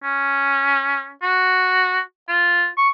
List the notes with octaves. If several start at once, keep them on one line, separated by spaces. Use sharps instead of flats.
C#4
F#4
F4
C#6